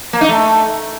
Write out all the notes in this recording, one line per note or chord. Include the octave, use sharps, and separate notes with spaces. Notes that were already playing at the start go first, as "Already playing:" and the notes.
A#3
D#4
A3